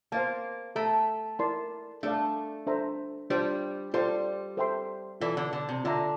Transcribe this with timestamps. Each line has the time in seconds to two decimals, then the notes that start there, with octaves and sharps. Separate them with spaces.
0.12 A#3 C5 F5 A5
0.76 A3 A4 E5 A#5
1.39 E4 A#4 D5 A5 C6
2.03 A3 D4 A4 D5 F5
2.67 D4 A4 C5 E5 A#5
3.30 G3 D4 F4 C5
3.94 G3 F4 A4 C5 F5 C6
4.57 A4 C5 E5 G5 C6
5.21 E3 F4 A4 D5
5.37 D3
5.53 D3
5.69 C3
5.84 D3 F4 A4 E5 A#5